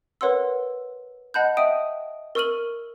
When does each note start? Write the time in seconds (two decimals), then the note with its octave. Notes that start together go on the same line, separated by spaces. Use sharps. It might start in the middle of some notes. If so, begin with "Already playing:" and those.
0.21 A#4 B4 C#5 F#5 C6 E6
1.34 D#5 F#5 A5 B5 F#6 G6
1.57 D#5 E5 G5 D#6 D7 D#7
2.35 A#4 C#6 E6 F6 D#7 F#7